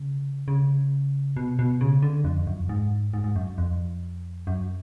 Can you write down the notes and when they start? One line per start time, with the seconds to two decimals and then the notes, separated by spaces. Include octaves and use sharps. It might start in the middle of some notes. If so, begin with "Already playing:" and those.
Already playing: C#3
0.48 C#3
1.37 B2
1.59 B2
1.81 C#3
2.02 D3
2.25 F2
2.47 F#2
2.69 G#2
3.14 G#2
3.24 G#2
3.36 F#2
3.58 F2
4.47 F#2